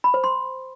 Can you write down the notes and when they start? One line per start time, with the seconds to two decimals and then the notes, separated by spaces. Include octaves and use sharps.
0.04 B5
0.14 C5
0.24 C6